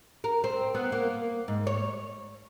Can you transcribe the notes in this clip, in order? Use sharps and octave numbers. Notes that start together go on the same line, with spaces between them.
A#4
C4
B3
A#3
G#2
C#5